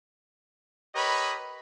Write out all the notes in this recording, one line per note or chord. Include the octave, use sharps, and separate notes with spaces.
G4 A#4 B4 C#5 D#5 B5